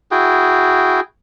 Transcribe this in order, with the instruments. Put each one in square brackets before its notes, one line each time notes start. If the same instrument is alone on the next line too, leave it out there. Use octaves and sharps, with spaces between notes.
[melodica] E4 F#4 G#4 G5